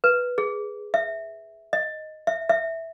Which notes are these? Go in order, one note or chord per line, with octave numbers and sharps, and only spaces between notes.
B4
G#4
E5
D#5
E5
E5